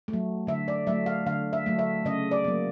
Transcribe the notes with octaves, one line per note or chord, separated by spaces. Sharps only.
A3
F#3
D3 E5
D5
F#3 A3 E5
F5
D3 F5
E5
F#3 A3
E5
C#3 D#5
D5
F#3 A#3